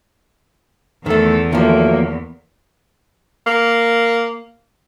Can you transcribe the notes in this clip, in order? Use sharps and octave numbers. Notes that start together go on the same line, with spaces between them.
E2 D#3 A3 A4
G2 D#3 F3 F#3 A3 A#3
A#3